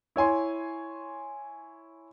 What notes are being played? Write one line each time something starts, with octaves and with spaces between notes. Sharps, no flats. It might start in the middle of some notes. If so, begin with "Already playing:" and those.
E4 C#5 G#5 C6